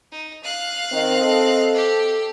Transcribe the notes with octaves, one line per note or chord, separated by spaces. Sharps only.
D#4
F5 F#6
D#3 C4 D#5
A4
G4